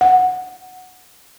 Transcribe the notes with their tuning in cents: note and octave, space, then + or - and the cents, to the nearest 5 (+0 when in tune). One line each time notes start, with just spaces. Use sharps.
F#5 -5